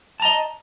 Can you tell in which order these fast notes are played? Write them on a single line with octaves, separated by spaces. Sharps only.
A5 A#5 D#5